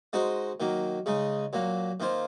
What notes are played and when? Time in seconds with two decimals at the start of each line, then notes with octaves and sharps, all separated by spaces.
0.13 G#3 D#4 F#4 C5
0.60 D#3 F#3 A#3
1.06 C#3 G#3 D#4
1.53 A#2 F#3 A#3
2.00 D#3 A#3 F4 C5